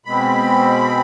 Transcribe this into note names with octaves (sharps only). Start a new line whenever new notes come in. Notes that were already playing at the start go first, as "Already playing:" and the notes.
B2 G#3 C4 B5